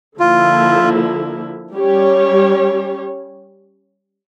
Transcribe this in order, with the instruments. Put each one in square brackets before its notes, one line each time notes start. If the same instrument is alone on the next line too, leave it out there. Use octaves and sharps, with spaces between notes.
[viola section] D3 F3 A#3 E4 [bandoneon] F4
[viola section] G3 C#4 G4 C#5